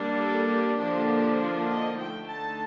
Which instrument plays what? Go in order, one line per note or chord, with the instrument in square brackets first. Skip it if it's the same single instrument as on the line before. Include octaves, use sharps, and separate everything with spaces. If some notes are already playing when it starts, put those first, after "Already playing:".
Already playing: [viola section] G3 A#3 D4
A4
G4
D3 F3 A#3 D4
F4
D#5
D3 A3 D#4 G5
A5